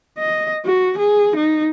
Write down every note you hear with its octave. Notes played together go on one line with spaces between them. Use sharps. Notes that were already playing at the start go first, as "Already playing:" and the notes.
D#5
F#4
G#4
D#4